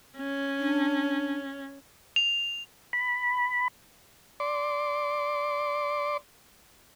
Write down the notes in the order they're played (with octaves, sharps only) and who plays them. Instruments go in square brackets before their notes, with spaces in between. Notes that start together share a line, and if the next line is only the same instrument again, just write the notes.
[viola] C#4
[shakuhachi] D4
[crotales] F7
[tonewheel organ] B5
[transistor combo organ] D5 C6 D6